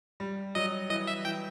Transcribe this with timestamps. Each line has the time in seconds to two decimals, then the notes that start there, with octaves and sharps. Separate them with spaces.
0.20 G3
0.55 F#3 D#5
0.90 E3 D#5
1.07 E5
1.25 E3 G5